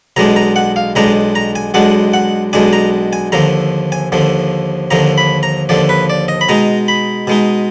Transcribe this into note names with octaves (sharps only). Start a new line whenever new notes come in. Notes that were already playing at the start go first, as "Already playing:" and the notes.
B1 B2 G#3 D4 A#5
A#5
F#5
F5
B1 B2 G#3 D4 A#5
A#5
G#5
B1 B2 G#3 D4 F#5
F#5
B1 B2 G#3 D4 G#5
A#5
G#5
D#2 D3 F3 A#5
G#5
D#2 D3 F3
D#2 D3 F3 A#5
B5
A#5
D#2 D3 F3 D5
B4
D5
D#5
B5
B2 G#3 D#4 A#5
B5
B2 G#3 D#4